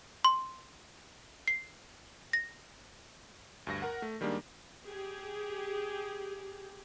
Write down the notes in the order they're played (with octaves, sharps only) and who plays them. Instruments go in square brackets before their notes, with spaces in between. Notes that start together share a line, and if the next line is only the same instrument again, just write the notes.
[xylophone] C6
C7
A#6
[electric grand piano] D2 G2 A#6
A#4 F#5
A3
D#3 G3 G#3 A#3 D4
[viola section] G4 G#4